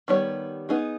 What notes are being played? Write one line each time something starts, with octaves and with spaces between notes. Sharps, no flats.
D#3 G3 B3 G4 C#5
B3 D#4 G#4